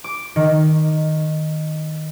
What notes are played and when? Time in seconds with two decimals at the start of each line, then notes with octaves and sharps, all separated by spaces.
0.04 D6
0.36 D#3